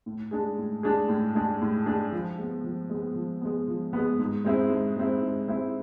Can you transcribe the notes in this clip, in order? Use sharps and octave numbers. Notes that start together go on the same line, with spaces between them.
A2
G#3 D4 G#4
A2
G#3 D4 G#4
A2
G#3 D4 G#4
A2
G#3 D4 G#4
F3
G#3 B3
F3
G#3 B3
F3
G#3 B3
F3
G#3 B3
G#2
G#3 C4 E4
G#2
G#3 C4 E4
G#2
G#3 C4 E4